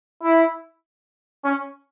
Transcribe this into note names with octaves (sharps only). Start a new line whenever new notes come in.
E4
C#4